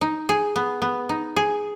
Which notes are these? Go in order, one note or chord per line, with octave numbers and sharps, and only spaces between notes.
D#4
G#4
B3
B3
D#4
G#4